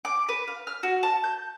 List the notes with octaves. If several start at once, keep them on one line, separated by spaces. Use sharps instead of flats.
D6
B4
F5
F6
F#4
A5
G6